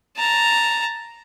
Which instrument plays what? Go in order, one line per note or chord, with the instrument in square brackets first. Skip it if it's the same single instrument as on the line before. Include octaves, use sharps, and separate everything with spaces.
[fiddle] A5 A#5